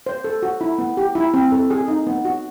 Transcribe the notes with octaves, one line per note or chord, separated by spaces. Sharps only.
C5
A4
F#4
E4
B3
G4
E4
C4
A4
G#4
D#4
B3
F#4